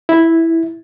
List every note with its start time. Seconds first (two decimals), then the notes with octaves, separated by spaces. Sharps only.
0.09 E4